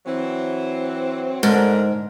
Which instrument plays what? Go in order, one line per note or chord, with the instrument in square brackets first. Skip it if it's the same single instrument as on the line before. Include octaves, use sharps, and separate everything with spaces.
[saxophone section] E3 F#3 C4
[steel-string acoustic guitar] G#2 [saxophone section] D3 A#4